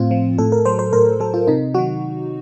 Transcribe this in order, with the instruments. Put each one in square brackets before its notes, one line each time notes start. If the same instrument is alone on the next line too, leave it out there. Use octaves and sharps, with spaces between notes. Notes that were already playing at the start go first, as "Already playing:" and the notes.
Already playing: [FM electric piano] A2 F3 C4 F4
F3
A2 A4
A#4
F#3 C5
C5
A2 A#4
F#3 A4
F4
C3 D#4
D#3 F#3 F#4